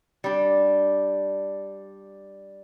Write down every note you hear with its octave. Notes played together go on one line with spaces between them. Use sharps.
G3 D4